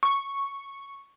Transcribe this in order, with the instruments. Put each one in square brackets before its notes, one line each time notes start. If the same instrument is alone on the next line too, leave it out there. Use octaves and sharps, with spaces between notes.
[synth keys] C#6